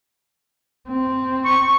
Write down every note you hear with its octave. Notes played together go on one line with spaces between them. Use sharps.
C4
C#6